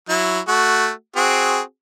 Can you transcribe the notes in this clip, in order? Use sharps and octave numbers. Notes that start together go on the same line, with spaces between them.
F#3 E4
A3 F#4
C4 F#4 G#4